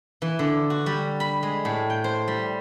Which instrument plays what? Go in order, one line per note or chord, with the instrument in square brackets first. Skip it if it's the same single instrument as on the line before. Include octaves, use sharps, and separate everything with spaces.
[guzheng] E3
D3
F#4
G3
B5
G#3
A2
G5
C5
G3